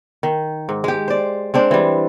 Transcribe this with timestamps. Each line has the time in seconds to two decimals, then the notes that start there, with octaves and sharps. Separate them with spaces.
0.23 D#3
0.69 G#2
0.84 G#3 G4
1.08 C5 D5
1.54 G#3 C4 D4 C5
1.71 E3 G3